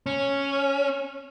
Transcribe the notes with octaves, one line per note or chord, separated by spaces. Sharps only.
C#4